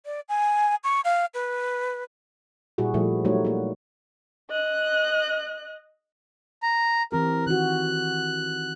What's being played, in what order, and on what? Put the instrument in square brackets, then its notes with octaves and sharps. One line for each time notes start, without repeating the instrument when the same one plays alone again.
[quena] D5
G#5
C#6
F5
B4
[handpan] A#2 G3 E4 F#4 G#4
A#2 F3 G3 A3 E4
F#3 G3 A3 D#4 F#4 C#5
A#3 F#4
[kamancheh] D#5 F#6
[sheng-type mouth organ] A#5
[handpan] E3 C4 G4 [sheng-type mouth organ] A#4
[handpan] D#3 F#4 [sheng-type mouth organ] F#6